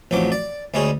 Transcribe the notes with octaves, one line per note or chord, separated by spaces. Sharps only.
A1 F2 F3 F#3 D6
D5
D2 G3 G#3 C#4 G#4